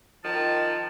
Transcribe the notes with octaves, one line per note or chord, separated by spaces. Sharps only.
D#3 F3 A5